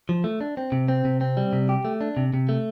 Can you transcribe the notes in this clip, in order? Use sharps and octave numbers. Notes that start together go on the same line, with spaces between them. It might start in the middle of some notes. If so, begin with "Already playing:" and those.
F3
A3
D4
C4
C3
C4
C3
C4
G3
C3
G4
A3
D4
C3
C3
A3